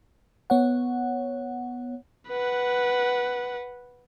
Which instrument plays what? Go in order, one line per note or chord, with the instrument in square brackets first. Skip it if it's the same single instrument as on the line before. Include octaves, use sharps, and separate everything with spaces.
[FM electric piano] B3 C#5 F#5
[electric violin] B4 F#5